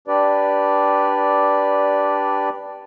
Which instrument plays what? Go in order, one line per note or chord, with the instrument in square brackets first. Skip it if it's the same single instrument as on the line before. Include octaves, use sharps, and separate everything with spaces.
[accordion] D4 G4 B4 D5